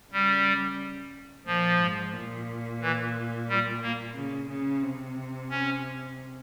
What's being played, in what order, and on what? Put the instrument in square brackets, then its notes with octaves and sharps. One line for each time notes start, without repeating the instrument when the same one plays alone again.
[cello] C#3 [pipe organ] G3
[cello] A#2 [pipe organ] F3
[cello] G#2
A#2
[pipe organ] E3
G3
A#3
[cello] C#3
C#3
C3
[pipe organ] C#4